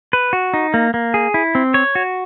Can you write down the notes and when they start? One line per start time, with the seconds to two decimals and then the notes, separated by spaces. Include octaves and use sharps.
0.13 B4
0.33 F#4
0.54 D#4
0.74 A#3
0.94 A#3
1.14 G#4
1.34 E4
1.55 C4
1.74 C#5
1.95 F#4